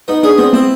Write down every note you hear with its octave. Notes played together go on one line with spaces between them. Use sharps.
B3 D#4
D4 G#4
B3 C4
C4 E4